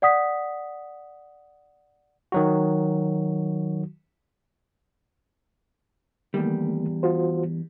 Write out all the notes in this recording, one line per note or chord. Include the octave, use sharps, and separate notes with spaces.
D5 F#5 D#6 B6
D#3 F#3 F#4
E2 D#3 G3 A3 A#3
F4 F#4 C5